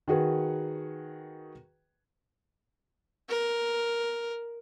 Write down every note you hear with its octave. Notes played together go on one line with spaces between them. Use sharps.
D#3 F#4 G#4 B4
A#4